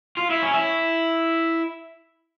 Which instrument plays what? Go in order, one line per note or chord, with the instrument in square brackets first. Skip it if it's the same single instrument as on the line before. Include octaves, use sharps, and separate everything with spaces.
[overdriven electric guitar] F4
E4
C#4
E4